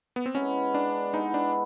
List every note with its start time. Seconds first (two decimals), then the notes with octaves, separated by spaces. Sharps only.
0.16 B3
0.26 C4
0.35 G#3 B3 C#4 E4
0.75 D4
1.13 G#3 B3 D#4 E4
1.34 D4